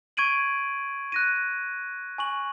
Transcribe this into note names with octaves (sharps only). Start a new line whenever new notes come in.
C#6 G#6 D7 D#7 F#7
F#6 A#6 D#7
G#5 C#6 F#7